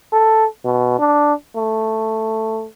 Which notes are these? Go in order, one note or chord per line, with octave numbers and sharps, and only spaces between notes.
A4
B2
D4
A3